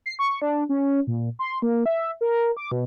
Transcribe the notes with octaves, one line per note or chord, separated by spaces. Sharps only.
C7
C#6
D4
C#4
A#2
C6
A#3
E5
A#4
D6
B2